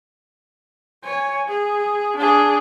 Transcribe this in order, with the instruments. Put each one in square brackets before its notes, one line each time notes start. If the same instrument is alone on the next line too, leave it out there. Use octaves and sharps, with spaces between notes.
[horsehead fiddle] C#5 G#5
G#4
D4 G#4